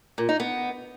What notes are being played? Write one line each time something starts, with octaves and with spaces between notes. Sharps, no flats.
A#2
D#4
B3